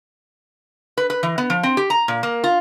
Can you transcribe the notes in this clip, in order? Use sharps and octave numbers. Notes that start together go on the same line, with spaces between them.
B4
B4
E3
B3
F3
C4
G4
A#5
A#2
A#3
F4